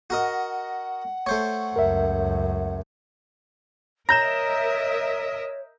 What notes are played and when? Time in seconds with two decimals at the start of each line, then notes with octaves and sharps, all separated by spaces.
0.10 F#4 A#4 D#5 F#5
1.26 A3 C5 C#5 C#6
1.76 C#2 F#2 A#4 E5
4.09 A#4 C#5 D#5 E5 A#5 G6 A#6 E7